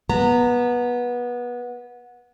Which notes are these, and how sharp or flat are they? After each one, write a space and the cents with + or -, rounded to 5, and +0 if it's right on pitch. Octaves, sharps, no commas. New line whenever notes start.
B3 -20 A#5 -20